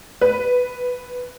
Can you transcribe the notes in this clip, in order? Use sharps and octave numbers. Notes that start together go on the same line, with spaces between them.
B4